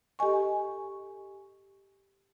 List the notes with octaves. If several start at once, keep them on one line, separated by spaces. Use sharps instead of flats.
G4 A4 D#5 G#5 C#6